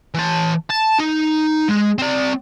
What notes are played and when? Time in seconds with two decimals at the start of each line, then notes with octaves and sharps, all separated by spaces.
0.15 E3 A5
0.70 A5
0.99 D#4
1.69 G#3
1.98 C4 D5